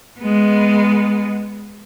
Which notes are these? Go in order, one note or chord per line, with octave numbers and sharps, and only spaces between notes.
G#3 B3